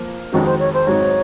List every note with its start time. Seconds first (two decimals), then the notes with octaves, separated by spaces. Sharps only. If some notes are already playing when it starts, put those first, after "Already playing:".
Already playing: F3 A#3
0.32 F2 D#3 G#3 C#4 D#4 F#4
0.45 C5
0.59 C#5
0.73 C5
0.87 G#2 F#3 C4 D#4 C#5